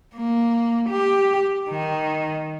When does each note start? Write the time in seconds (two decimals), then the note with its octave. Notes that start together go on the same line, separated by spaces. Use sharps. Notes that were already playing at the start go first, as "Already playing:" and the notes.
0.16 A#3
0.90 G4
1.70 D#3